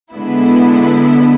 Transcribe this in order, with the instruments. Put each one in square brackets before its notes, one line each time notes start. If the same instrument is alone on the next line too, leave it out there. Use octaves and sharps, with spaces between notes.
[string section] D3 G#3 B3 E4